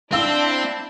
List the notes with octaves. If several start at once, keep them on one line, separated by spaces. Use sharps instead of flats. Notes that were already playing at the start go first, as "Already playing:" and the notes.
C4 D4 E4 F5 E6